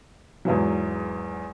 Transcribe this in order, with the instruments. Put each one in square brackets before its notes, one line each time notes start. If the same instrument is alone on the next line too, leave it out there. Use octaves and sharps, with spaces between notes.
[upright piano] E2 G#2 E3 F#3